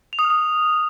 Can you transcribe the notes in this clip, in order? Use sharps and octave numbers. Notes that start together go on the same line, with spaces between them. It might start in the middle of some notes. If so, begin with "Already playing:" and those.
F7
D#6
F6
D#6